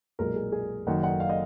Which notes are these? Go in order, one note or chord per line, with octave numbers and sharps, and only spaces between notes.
B1 A#2 G#3 A#4
G#4
G#4
F#1 F#2 D#3 F#5
F#5
F5
D#5